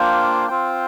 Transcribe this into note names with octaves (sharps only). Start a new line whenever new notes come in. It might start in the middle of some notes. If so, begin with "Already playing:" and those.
Already playing: A#3 D4 F4 C5 G5
C4 F4 C5 G5